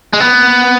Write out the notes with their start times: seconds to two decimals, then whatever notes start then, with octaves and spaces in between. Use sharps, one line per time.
0.13 G#3
0.20 B3